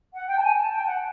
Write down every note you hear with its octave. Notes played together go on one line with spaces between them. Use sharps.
F#5
G5
A5
G#5
A5
G5
F#5